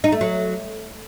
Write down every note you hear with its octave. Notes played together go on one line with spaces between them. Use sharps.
D#4
A3
F#3